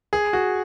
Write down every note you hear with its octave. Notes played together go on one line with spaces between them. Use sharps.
G#4
F#4